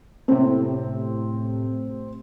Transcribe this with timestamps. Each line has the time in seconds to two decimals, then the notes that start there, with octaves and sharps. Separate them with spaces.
0.28 A2 C3 C4